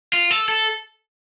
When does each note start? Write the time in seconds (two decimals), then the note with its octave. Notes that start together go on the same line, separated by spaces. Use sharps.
0.13 F4
0.31 A4
0.48 A4